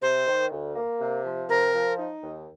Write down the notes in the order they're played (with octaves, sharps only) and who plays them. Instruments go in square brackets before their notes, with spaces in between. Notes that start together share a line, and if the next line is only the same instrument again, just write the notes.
[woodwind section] C3 [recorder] C5
[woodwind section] D#3
D2
A#3
C3
F3
[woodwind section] C3 [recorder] A#4
[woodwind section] F3
D#4
D#2